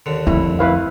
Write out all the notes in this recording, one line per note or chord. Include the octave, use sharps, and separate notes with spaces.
D#2 D3
F2 E4
E4 B4 F5